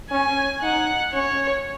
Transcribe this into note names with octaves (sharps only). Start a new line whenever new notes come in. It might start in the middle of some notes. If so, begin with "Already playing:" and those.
C#4 G#5
D#4 F#5
C#4 C#5